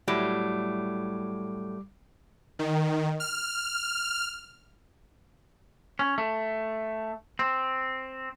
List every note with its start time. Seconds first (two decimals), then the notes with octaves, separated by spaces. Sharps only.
0.08 A2 F#3 G3 D6
2.59 D#3
3.20 F6
5.99 C#4
6.18 A3
7.39 C4